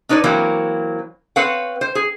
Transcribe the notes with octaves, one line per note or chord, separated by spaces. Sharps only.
D4 D#4 B4 C#5 D5
E3 F#3 A#3 C4
C4 B4 C#5 F5 F#5
C5
G#4